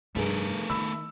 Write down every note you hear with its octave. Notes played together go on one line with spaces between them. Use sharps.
F1 G2 A3 G#4 A#4
D#3 B5 E6